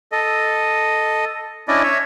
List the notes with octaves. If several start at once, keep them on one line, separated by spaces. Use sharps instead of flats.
A4 D#5
C#4 D4 E4 D5 D#5
C#5 E5